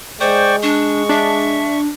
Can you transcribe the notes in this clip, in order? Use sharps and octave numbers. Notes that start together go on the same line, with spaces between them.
G#3 C5 D5 G5 C#6
D4 C#6
D4 E5